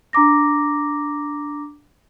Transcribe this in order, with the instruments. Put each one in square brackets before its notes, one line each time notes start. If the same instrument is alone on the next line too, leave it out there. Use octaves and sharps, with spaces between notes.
[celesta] D4 A#5 D6 A#6